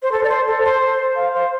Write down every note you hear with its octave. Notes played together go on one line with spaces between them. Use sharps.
C5
A4
D5
C5
A4
C5
F5
C5